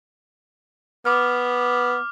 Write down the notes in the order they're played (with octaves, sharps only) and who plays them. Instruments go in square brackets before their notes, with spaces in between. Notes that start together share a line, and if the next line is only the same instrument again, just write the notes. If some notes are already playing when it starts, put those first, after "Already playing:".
[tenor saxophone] B3 [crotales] D6 F6